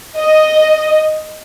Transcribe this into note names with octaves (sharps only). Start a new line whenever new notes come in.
D#5